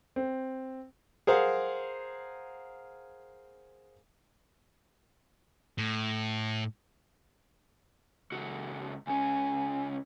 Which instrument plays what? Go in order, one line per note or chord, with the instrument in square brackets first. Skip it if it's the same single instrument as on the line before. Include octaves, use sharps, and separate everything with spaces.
[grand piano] C4
[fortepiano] G#4 A#4 C5 F5 F#5
[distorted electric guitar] A2
[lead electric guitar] C#2 F#4
[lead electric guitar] C#2 C#4 [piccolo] G#5